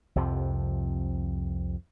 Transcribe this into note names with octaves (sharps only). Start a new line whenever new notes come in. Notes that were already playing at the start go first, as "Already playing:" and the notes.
C2 F2 C3 F3